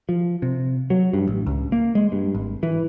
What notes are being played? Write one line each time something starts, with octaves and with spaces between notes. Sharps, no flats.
F3
C3
F#3
G2
A1
C#2
A#3
G#3
G2
G#1
E3